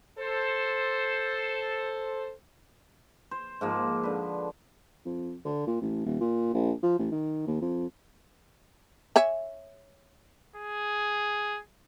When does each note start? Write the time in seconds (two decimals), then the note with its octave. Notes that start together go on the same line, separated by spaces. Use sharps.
0.19 A4 C5
3.31 C5
3.61 G#2 F3 A#3
4.03 D3 B4
5.05 F2
5.45 D3
5.67 A#2
5.81 A1
6.06 D#1
6.20 A#2
6.54 A#1
6.83 F3
6.99 A1
7.11 D#3
7.47 D#2
7.61 F2
9.16 C#5 E5 G#5
10.56 G#4